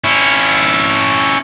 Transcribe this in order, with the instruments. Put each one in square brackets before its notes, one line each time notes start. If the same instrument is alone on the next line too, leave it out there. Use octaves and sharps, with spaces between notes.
[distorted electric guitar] C#4 E4